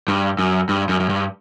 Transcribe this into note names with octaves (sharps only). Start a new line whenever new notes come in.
G2
F#2
G2
F#2
F#2
G2